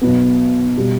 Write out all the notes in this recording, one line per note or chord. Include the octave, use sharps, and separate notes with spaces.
B1 B2 B3
B2 G3